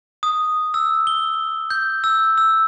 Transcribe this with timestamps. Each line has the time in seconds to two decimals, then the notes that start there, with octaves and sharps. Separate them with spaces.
0.23 D#6
0.74 E6
1.07 G7
1.70 G6
2.04 E6
2.38 E6